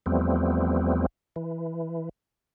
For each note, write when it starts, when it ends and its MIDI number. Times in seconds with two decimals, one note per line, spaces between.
0.06 1.06 40
0.06 1.06 53
0.06 1.06 55
0.06 1.06 57
0.06 1.06 59
0.06 1.06 60
1.36 2.09 52